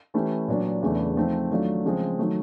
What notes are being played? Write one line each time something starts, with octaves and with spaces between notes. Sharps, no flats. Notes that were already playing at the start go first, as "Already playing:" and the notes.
E3 A3 C#4 E4 G4
A#2 F#3 B3 D4
E2 C#3 E3 A3 D4
F3 A3 C4 D#4
D#3 F#3 A3 D4 F4
C#3 F3 G#3 C4
D#3 F#3 A3